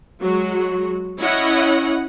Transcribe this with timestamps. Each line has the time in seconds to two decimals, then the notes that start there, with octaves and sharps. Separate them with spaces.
0.22 F#3 G#3 F#4
1.21 C#4 E4 C#5 D#5 F#5